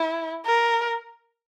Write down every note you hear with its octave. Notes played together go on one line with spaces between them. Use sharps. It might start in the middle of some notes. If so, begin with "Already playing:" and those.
Already playing: E4
A#4